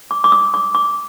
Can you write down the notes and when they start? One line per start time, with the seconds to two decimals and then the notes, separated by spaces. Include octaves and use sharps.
0.11 D6
0.24 D6
0.32 D#6
0.54 D6
0.75 D6